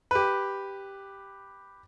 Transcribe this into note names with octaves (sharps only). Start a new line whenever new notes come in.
G4 B4